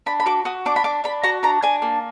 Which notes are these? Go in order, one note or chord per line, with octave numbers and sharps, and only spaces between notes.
D4 B5
B5
F#4 D6
F#4 D#6
D4 D6
B5
D4 D6
D4 B5
F#4 A#5
D4 A#5
D4 G#5
A#3